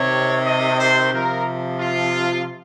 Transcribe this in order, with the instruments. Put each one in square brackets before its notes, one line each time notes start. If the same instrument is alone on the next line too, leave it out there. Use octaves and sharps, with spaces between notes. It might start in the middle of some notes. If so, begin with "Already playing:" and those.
Already playing: [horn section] C3 D#3 C#5
D#5
C5
C3 F3 A#4
F4